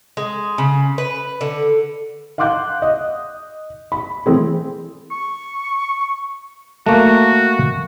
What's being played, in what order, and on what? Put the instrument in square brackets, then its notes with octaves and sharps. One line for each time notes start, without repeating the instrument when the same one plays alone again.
[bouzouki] G#3
C#3
B4
D3
[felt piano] F5 F#5 C6 D6 F#6 G6
D#5
B5
E3 A3 C4 G#4
[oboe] C#6
[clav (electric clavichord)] A3 A#3 [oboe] F#4